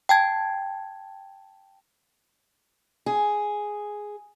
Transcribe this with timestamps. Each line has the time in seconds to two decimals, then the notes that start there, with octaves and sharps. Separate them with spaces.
0.09 G5 A5 G#6
3.06 G#4